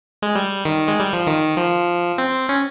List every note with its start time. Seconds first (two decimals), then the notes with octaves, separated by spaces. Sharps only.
0.22 G#3
0.35 G3
0.65 D#3
0.88 G#3
1.00 G3
1.13 F3
1.27 D#3
1.57 F3
2.18 C4
2.49 C#4